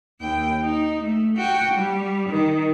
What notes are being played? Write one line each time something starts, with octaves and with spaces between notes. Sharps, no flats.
D#2 G5
D#4
A3
F#4 G5
G3
D#3